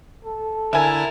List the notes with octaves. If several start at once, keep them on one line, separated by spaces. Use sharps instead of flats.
A4
D3 E4 A#4 E5 G#5 A5